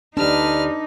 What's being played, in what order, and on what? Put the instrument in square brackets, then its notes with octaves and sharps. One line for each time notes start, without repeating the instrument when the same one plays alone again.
[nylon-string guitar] D2 G4 A5 [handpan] D4 [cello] D#4 [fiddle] B4 F6